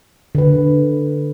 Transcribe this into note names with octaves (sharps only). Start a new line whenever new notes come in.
D3 B4